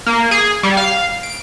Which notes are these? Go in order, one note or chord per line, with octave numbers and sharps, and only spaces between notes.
A#3
G#4
G3
F5
D7